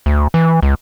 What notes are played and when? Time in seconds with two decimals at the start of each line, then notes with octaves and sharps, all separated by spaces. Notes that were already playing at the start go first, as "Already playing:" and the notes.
0.06 D2
0.34 E3
0.63 C#2